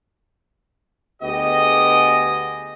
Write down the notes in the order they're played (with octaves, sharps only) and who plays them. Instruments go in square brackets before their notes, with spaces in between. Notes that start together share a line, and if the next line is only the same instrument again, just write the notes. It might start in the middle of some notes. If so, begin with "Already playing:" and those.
[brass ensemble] D2 B3 G4 G#4 D#5